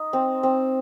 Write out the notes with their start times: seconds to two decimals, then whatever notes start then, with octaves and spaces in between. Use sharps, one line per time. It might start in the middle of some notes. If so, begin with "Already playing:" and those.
Already playing: D#4
0.13 C4
0.43 C4